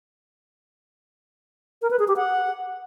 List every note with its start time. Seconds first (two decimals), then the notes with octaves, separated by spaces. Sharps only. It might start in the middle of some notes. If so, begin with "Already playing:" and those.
1.82 A#4
1.91 B4
1.99 G#4
2.08 G4
2.17 F#5